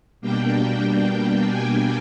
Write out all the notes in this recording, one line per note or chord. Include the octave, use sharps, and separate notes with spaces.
B2 G3 A#3 D4 G5
G#5